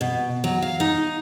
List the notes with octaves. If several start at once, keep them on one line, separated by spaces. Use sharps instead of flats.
B2
F#3
F5
D#4